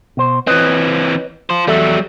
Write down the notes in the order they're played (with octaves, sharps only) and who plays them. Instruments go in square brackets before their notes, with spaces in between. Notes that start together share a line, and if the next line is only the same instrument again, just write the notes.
[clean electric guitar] B2 C5
[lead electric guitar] E3 C4 [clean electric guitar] B4 C#5 D#5
[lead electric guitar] F4 C5
[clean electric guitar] E2 A4 E5 [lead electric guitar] F#3 G3